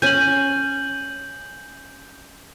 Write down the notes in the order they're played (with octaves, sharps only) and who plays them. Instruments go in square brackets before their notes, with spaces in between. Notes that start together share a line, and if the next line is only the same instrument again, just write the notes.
[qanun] C#4 G#5 [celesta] G6 D#7 F#7